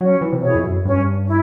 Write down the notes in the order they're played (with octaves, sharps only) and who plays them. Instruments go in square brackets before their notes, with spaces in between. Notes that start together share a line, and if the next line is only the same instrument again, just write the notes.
[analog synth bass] F#3 [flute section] C#4
[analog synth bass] E3
C3
[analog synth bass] B2 [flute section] E4 G#4 C#5
[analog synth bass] F2
F#2
[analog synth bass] G2 [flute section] C#4
[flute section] E4